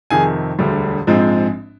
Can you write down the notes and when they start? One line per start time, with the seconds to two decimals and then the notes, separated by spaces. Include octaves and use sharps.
0.10 F2 C3 D#3 G#4 G#5
0.59 E1 D2 D3 G3
1.07 A#1 G#2 F3 G#3 C4